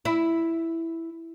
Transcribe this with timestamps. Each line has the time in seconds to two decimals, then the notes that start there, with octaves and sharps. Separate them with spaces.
0.05 E4